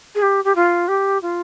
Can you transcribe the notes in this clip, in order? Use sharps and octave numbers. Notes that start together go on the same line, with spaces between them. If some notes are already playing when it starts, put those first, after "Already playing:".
G#4
G4
G4
F4
G4
F4